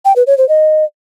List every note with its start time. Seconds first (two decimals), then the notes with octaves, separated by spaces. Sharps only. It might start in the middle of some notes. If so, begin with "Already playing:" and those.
0.05 G5
0.16 B4
0.27 C#5
0.38 C5
0.49 D#5